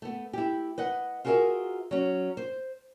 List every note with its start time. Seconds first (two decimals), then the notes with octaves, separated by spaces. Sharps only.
0.02 A3 B3
0.33 E4 G4
0.78 B4 D#5 F#5
1.25 F4 F#4 G#4 A#4 D5 E5
1.91 F#3 C#4
2.37 C5